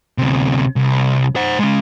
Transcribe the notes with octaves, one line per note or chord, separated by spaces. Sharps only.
D2 C3
C2
C5 F#5
G#3 C#4